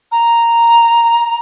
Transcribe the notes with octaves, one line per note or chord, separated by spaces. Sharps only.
A#5